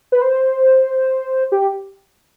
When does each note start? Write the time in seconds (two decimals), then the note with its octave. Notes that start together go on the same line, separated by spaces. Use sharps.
0.12 B4
0.22 C5
1.52 G4